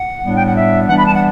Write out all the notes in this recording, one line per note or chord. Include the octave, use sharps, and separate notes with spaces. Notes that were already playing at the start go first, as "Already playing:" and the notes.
Already playing: F#5
A2 G3 B3 D4
G5
F#5
E5
E3 G3 B3 D4 F#5
B5
A5
F#5